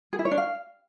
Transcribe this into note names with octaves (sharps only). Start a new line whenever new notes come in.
G#4
E4
C#5
D4
F5